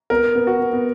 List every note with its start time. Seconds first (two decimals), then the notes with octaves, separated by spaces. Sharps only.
0.10 B3 A#4
0.35 B3
0.47 F#4
0.59 B3
0.73 B3